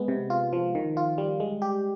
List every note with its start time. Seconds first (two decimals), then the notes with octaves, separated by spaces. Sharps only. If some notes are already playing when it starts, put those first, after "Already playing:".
Already playing: G#3 B3
0.08 C3
0.30 F4
0.53 F3
0.75 D#3
0.97 F4
1.18 G3
1.40 G#3
1.62 G4